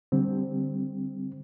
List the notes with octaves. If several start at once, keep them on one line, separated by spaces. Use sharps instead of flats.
D3 G3 C4